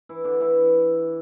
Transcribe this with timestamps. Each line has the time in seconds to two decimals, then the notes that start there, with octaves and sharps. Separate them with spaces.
0.09 E3 E4
0.24 D3 D4
0.40 E3 E4